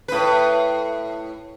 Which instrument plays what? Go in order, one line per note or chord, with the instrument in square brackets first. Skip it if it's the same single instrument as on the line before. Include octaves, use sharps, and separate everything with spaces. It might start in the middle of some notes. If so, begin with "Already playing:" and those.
[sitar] A2 B4